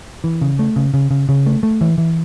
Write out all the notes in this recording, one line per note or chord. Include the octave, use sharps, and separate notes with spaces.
E3
C#3
A3
C#3
C#3
C#3
C#3
A3
A3
E3
E3